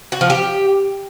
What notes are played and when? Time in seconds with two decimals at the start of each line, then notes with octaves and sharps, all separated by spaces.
0.12 F#4
0.21 F3
0.30 G4